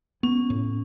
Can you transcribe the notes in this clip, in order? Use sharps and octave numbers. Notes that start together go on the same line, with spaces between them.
B3 C#4
A2